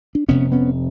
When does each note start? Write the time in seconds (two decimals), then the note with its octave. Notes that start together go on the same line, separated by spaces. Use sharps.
0.15 D4
0.28 F1 F2 C3 B3 C#4
0.52 B3 C#4